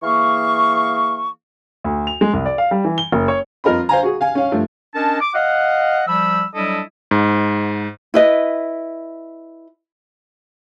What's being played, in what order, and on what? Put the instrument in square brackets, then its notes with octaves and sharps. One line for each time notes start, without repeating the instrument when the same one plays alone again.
[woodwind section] E3 A#3 G#4 F5 C#6
[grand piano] D2
F7
G#3
C2
D5
F5
G3
E3
G7
F#1
C#5
[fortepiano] F2 F4 A#4 D#5 B5
C5 F5 G#5 A#5
F#4 G#4
F5 G#5
C#4 F5
G2 F3 A3
[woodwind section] C#4 D4 A#4 D#5 A5
D6
D#5 F5 F#5
F3 G3 B5 E6
F#3 G3 D4 E4 A4 D#5
[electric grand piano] G#2
[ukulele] E4 B4 D#5